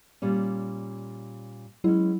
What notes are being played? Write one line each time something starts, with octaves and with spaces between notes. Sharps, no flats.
A#2 G3 C#4
F#3 G#3 C#4 E4